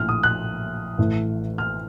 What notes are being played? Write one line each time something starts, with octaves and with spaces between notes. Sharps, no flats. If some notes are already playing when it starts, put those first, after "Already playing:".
Already playing: A#1 A2 A3 F6
D#6
F#6
A1 A2 A3
F6